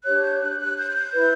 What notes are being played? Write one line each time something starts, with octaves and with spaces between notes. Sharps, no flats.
D4 G4 C#5 F#6
G6
F#6
F#6
G6
F#6
G6
E4 B4